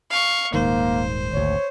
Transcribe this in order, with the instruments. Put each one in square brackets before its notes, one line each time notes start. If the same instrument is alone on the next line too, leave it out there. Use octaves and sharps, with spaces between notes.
[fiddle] F5 C#6
[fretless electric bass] D#1 G#2 D#3 [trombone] A#3 [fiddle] C5
[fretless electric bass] G#1 D2 [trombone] C#5